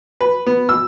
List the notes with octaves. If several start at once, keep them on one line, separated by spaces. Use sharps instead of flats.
B4
B3
E6